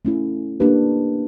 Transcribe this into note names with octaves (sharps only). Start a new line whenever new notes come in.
A3 C#4 E4
A#3 D4 G4 B4